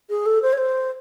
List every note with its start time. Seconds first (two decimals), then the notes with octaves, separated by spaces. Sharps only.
0.10 G#4
0.26 A4
0.42 C5
0.53 C#5
0.58 C5